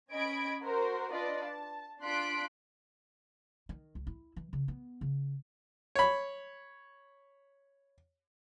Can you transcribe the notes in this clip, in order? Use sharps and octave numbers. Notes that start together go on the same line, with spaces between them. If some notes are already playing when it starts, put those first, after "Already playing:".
C#4 D#5 B5 G#6 D7
F#4 A#4 C5
D4 F4 B4 D5 D#5
A5
D4 F4 C6 F#6 B6 D7
D#3
C#2
E4
E3
C#3
B3
C#3
C#5 B5